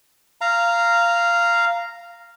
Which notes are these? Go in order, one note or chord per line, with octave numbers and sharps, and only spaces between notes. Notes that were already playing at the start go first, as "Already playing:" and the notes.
F5 A#5